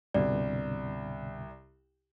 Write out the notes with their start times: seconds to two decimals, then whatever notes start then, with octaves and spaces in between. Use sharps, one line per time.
0.14 C2 G2 B2 D3 D5